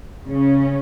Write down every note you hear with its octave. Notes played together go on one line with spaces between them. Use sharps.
C#3 C#4